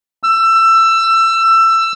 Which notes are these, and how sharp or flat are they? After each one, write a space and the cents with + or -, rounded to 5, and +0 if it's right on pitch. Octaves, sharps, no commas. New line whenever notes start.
E6 +20